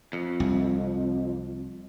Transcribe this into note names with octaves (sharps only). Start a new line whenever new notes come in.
F2
C2